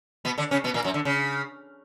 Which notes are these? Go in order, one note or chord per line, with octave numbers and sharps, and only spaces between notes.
B2 B3
D3 D4
C#3 C#4
B2 B3
A#2 A#3
F#2 F#3
D3
C#3